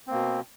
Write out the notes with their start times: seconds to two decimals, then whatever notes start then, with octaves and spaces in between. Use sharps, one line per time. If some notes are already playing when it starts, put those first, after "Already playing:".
0.07 C4
0.11 A#3
0.14 B2